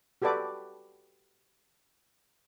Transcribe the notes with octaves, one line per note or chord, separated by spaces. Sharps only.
F#4 G4 A4 B4 D5 D6